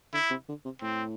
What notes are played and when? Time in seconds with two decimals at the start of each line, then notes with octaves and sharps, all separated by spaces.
0.13 D3 E4
0.30 C3
0.48 D3
0.65 C3
0.82 A2 C4